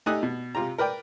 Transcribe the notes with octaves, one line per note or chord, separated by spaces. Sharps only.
A3 D#4 G4 G#5 D#6 F#6
B2
C3 F4 G4 A#5
A#4 B4 D5 G5